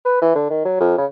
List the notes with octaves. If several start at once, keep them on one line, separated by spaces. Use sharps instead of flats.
B4
E3
D3
D#3
F#3
F2
C#3